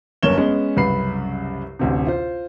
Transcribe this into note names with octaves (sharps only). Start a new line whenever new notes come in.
G1 F#2 A#3 C#5 E7 G7
G#3 B3 C#4
C2 F#2 C#3 B4 B5 C7
A1 D2 C3
F4 C5